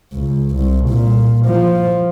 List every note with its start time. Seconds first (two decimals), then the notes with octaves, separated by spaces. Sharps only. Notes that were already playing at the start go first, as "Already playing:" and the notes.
0.13 C#2
0.55 C2
0.90 A#2
1.46 F3